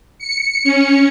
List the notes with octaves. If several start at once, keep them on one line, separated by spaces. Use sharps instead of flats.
C#7
C#4